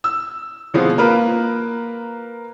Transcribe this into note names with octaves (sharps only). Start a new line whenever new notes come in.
E6
B2 F3 G#3 B3 C4
A#3 F4 A#4 B4